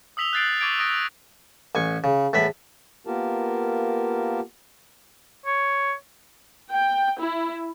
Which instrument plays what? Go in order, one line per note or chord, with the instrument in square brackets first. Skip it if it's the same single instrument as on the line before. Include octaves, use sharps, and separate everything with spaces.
[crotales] D#6 E6 B6 F7 G7
F#6 G6 A6 C7 D7
C#6 D6 G#6 D7
D6 D#6 A#6 D7 F7
[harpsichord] A1 G#5 C#6
C#3
E2 A2 B4 E5 B5
[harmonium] A#3 B3 F4 G4 A#4 A5
[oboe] C#5
[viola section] G5
E4